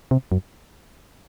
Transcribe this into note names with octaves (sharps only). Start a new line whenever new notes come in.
C3
F#2